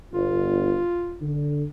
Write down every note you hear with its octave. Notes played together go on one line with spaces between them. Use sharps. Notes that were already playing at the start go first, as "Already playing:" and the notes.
G1 F4
D3